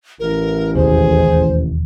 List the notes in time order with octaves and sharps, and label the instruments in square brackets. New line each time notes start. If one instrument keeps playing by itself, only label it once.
[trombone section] A1 [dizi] A#4
[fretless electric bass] E1 D#2 [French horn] G#4 [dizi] C5